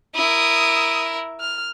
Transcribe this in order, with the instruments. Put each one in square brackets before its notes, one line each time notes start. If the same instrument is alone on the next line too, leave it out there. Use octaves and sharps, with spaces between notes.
[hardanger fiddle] E4 A#4 [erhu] D#6
[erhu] F6